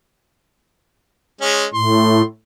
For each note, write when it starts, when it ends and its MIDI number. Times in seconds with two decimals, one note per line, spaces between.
1.41 1.66 56
1.41 1.66 61
1.74 2.22 45
1.74 2.23 84